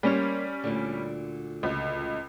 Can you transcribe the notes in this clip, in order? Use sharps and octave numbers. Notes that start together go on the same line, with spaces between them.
G3 A#3 C#4 C5 C#5
D2 A#2 D3
C#2